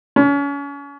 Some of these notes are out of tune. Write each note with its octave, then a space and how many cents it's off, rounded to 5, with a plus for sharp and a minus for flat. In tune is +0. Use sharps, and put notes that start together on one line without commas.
C#4 +35